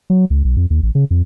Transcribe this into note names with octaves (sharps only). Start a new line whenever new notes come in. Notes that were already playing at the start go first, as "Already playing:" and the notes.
F#3
C#2
B1
F2
D#2
A1
C#3
F2